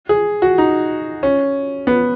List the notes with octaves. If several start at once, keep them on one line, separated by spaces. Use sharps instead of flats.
G#4
F#4
D#4
C#4
B3